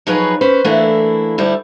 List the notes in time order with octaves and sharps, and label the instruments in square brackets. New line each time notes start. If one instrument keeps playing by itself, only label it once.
[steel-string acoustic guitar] F3 F#3 D#4 G#4 B4 C#5
C#4 B4 C5
E3 A3 A#3 D4 E4
D2 G3 E4